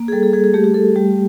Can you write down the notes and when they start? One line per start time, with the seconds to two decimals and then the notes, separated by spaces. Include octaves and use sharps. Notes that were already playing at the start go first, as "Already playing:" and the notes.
Already playing: A#3
0.08 G#4
0.12 G3 A4
0.23 G#4
0.33 G3 G#4
0.44 G#4
0.54 A3 G4
0.64 G4
0.74 A3 A4
0.96 G3 G4